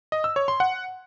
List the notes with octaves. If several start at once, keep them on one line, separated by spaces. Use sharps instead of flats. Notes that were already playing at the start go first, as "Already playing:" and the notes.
D#5
E6
C#5
C6
F#5